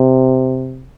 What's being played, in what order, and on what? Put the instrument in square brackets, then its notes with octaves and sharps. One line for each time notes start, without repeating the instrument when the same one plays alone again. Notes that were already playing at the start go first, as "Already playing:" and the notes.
Already playing: [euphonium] C3